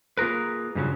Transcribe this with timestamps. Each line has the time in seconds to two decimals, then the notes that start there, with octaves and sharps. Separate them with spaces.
0.17 A#3 F4 G#4 A#4 B4
0.75 G2 C#3 F3 F#3